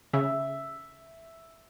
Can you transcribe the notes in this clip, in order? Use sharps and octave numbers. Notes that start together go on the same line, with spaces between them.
C#3 E5